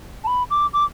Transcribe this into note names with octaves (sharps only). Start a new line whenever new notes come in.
A5
B5
D6
D6